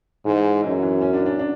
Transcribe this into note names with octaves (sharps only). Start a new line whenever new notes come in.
G#2 E3
F#2 E3
E3
C#4
D4
D4
D4